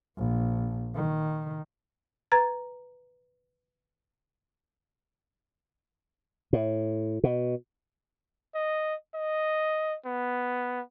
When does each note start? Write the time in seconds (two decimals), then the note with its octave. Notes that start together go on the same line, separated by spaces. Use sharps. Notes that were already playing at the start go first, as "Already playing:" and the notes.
0.18 A#1
0.95 D#3
2.32 B4 A#5 G#6 A6
6.53 A2
7.24 B2
8.55 D#5
9.15 D#5
10.06 B3